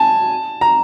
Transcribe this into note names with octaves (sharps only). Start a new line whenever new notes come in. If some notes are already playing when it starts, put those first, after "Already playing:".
Already playing: G#5 A5
A#5